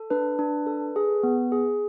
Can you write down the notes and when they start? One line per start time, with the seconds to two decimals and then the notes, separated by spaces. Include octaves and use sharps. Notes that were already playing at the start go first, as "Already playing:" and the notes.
Already playing: A4
0.10 D4 B4
0.39 D4
0.66 A4
0.96 G#4
1.23 B3
1.52 G#4